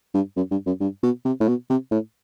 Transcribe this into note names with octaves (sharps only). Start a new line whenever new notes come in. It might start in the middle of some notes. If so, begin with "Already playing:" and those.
G2
F#2
G2
F#2
G2
B2
C3
A2
B2
C3
A2